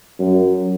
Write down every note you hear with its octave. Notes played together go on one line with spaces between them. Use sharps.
F#2